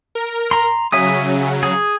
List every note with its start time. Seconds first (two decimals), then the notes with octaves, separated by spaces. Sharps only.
0.15 A#4
0.51 A#5 C6
0.92 C#3 F#3 E5 G#5 D#6
1.63 G#4